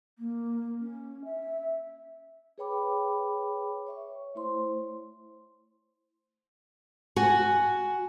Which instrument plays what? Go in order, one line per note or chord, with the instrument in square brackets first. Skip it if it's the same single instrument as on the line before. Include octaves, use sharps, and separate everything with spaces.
[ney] A#3
C#4
E5
[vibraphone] G#4 B4 C#5 G5 B5 D6
C#5 E5 C#6
A3 E4 C5 C6
[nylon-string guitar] F#4 F#5 G#5